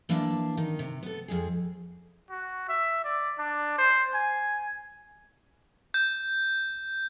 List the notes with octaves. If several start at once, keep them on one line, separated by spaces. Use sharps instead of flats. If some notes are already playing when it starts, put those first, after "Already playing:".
E3 A#3 D4 E5 F5 A5
D#3 D#4
C3
B3 A4
F2 G#3 G#4
F#4
E5
D5
D4
C5
G#5
G6